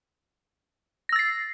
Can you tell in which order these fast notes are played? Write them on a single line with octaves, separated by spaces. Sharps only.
A#6 E6 A6 C7